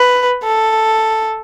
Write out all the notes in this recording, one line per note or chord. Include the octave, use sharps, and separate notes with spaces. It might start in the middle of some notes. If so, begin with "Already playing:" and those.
Already playing: B4
A4